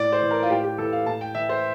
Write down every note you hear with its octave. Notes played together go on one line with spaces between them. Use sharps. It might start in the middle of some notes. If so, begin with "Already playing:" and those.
Already playing: A2 D5
C5
E3
A#4
F4
A2 G4
G4
E3 A4
F5
A2 A5
G5
E3 E5
C5